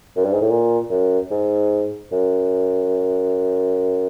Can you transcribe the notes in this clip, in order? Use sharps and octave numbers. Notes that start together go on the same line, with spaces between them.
F#2
G2
G#2
A2
A#2
F#2
G#2
F#2